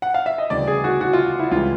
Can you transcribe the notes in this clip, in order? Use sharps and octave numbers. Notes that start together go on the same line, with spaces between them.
F#5
F5
E5
D#5
D2 C#3 E3 G3 D5
G#4
F#4
F#4
F4
E4
C#2 C#3 E3 G3 F4